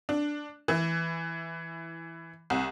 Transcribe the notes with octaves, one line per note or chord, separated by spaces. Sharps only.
D4
E3
C2